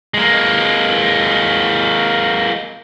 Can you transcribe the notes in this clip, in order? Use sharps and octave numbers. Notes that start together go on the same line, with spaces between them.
G#3 A#3